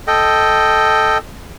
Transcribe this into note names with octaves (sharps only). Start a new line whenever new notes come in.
A4 D#5 G5